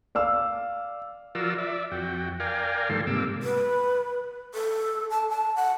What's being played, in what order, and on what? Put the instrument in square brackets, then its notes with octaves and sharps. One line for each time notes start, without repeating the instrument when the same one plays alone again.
[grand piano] D5 F5 E6
[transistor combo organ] F3 F4 F#4 A#4 D5 E6
D5 E5
F2 F#4 G5
A#4 D5 F5 G5 G#5
G2 D#3 F3 A3 A4 C6
G#2 C3 G3 A#3 D6 E6
[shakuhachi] B4
A4
A5
A5
F#5